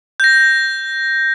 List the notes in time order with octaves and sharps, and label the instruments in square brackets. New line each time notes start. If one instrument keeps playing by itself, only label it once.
[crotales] G6 A#6